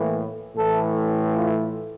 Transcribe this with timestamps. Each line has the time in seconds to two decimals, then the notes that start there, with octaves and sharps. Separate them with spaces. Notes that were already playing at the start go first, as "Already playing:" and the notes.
Already playing: A2 E3 A#3
0.57 A2 E3 A3 A4
1.37 F4